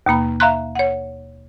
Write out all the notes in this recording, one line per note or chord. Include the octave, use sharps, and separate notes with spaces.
D#2 B2 A#3 B5
E5 F5 A#5 C6 F#6
C#5 F#5